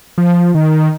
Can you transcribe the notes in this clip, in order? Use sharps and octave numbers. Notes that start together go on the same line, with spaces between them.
F3
D#3